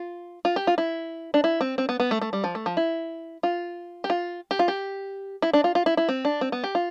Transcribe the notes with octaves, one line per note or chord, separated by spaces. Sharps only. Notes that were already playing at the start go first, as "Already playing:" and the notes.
Already playing: F4
F4
G4
F4
E4
D4
E4
C4
C4
B3
B3
A3
A3
G3
F3
A3
F3
E4
F4
G4
F4
G4
F4
G4
E4
D4
F4
F4
E4
E4
C4
D4
C4
B3
G4
F4